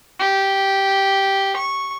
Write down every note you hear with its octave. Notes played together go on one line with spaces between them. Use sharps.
G4
C#6